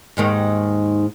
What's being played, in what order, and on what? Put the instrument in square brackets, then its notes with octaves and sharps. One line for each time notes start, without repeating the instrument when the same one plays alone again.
[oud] D#2 G#2 D#3